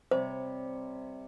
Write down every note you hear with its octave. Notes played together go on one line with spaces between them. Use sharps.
C3 G3 C5 C#5